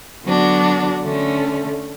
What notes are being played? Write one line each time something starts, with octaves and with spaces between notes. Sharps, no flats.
D3 F#3 B3 D4 F#4
D3 A3 C#4